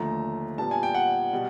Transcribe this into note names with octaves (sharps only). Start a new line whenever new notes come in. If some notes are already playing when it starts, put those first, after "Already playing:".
Already playing: D#2 D3 F3 A3 A#5
A#2 G3 B3 A5
G#5
G5
F#5
B2 G3